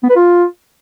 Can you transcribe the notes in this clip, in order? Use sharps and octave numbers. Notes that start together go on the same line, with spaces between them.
B3
B4
F4